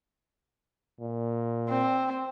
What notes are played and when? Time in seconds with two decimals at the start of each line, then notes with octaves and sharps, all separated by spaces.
1.00 A#2
1.69 C4